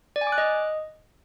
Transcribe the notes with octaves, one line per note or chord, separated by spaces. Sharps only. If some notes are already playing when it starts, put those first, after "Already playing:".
D5
G#5
D6
F#6
D#5